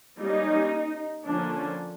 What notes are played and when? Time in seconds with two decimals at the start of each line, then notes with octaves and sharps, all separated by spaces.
0.18 G3 A#3 C#4 D#4
1.26 D3 F3 A#3 C#4 D4